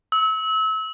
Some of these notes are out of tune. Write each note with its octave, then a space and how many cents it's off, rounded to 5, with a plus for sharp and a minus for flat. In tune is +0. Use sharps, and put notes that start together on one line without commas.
E6 -30